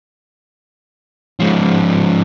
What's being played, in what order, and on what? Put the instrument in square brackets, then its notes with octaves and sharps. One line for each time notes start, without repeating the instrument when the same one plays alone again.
[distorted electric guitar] G#2 F3